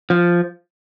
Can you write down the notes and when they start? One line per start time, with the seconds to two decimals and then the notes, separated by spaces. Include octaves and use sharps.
0.10 F3